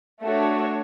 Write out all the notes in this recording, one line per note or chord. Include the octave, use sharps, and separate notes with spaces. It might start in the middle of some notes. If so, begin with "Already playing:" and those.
A3 D4 F#4 C#5